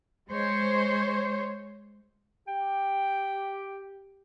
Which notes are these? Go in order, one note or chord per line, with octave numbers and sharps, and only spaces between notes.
G#3 C5 C#5
G4 G5